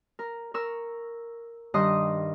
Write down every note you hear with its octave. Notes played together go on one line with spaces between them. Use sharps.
A#4
A#4 C#6 E6
G2 D#3 D#5 C6 D#6